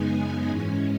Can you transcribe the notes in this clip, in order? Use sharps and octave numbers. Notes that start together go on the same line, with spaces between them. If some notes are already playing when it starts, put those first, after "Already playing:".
Already playing: F#2 C#3 G#3 B3 D#4 G#5
G#2 E3 G#3 C#4